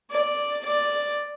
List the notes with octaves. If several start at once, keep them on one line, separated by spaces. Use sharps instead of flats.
D5
D5